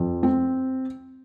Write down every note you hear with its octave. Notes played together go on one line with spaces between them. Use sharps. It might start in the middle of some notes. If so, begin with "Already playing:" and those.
Already playing: F2
C4